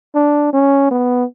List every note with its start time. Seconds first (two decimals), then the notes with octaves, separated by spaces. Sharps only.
0.15 D4
0.53 C#4
0.91 B3